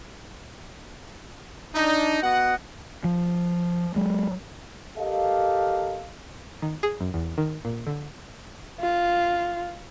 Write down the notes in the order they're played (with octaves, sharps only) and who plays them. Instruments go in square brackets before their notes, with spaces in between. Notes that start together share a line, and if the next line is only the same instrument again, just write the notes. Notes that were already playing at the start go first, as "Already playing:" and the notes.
[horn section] D4 D#4
B3 F#4 D#5 F#5
[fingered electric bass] F3
F#3 G#3
[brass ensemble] G4 A4 A#4 D#5 F5
[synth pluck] D#3
G#4
F#2
E2
D#3
A#2
D3
[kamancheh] F4